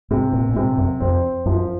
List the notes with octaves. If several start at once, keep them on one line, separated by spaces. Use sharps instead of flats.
G#2 C3
A#2
A#2
G#2 C3
F#2
F2 C4
F#2 F3